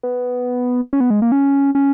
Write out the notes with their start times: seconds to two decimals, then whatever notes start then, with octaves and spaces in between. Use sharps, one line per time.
0.03 B3
0.93 C#4
1.00 B3
1.10 G#3
1.22 A#3
1.32 C#4
1.75 C#4